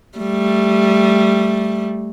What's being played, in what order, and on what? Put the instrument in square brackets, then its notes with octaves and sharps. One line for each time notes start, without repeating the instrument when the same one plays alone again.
[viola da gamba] G3 A3